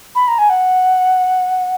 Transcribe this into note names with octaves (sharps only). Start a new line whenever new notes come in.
B5
A#5
G#5
F#5